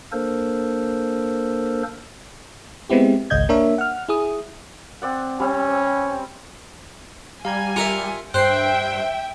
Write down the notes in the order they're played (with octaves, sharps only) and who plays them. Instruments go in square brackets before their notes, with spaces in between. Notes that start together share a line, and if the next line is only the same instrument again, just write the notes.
[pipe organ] A#3 D4 A4 A#4 C5
[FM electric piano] G#3 B3 C4 E4 G4
G#1 C#2 D#5 G6 G#6
A#3 D4 A#4 C#5 E5
F#5 F6
E4 G#4 D#6
[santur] C4 D5 F#5
[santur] G3 C4 [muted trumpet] C#4
[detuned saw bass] G3 [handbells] F5 A#5 G#6 [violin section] G#5
[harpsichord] F4 A#4 E5 [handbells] G4 C#7
[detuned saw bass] G2 [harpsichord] C5 [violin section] E5 G5 [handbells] F#6 C7